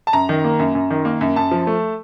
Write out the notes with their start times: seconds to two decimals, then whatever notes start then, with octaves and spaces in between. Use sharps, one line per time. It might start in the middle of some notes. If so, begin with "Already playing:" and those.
0.07 A5
0.13 F#2 A#5
0.29 D#3
0.44 A#3
0.59 F#2
0.75 F#2
0.90 D#3
1.05 A#3
1.21 F#2
1.36 F#2 A5
1.51 F3
1.67 A3